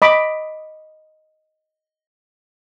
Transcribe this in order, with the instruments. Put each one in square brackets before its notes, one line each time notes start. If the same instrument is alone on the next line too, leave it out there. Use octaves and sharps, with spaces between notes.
[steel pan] D#5 B5 D6